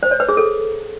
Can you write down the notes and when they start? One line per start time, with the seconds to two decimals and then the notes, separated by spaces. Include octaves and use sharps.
0.03 C5
0.11 C#5
0.20 B4
0.29 G#4
0.37 A4